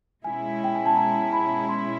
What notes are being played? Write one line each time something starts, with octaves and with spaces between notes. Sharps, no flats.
B2 G#3 C#4 E4 G#5
G5
G#5
A5
A#5
B5
C6